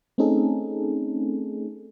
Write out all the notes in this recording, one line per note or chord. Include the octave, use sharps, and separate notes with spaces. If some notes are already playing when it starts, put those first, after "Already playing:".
A3 C4 C#4 D#4 G#4 A4